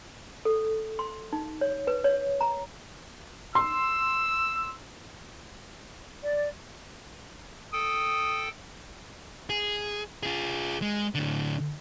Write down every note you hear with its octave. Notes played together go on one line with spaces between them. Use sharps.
A4
C6
D#4
C#5
B4
C#5
A#5
C6 E6
D5
A4 G5 D#6
G#4
F4 G#4
G#3
A2 D3